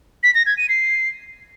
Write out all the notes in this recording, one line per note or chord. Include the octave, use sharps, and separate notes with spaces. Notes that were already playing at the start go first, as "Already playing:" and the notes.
B6
A#6
G#6
D#7
C7